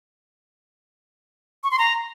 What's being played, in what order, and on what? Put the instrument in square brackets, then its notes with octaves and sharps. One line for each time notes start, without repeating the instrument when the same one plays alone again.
[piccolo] C#6
C6
A#5